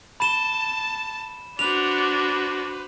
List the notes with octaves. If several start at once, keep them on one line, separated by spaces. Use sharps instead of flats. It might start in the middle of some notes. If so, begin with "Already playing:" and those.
A5 B5 E7 G7
D4 F#4 B4 C5 F7